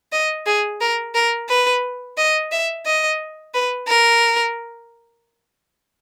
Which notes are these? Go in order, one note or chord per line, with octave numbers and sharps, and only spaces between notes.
D#5
G#4
A#4
A#4
B4
D#5
E5
D#5
B4
A#4